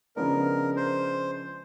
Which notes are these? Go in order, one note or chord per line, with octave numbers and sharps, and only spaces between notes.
C#3 F3 G#3 B3 D4 A#4
C5